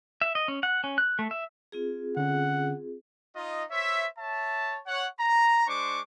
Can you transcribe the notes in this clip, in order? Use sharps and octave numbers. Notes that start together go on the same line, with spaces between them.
E5
D#5
C#4
F#5
C#4
F#6
A3
E5
C4 F4 G#4
D3 C#4 F#5
D#4 F4 D#5
C5 C#5 E5
C#5 E5 A5
C#5 F#5
A#5
G#3 D4 C5 C#6 D6